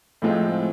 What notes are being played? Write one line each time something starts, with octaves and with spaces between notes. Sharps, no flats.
A2 F3 G#3 C4 F4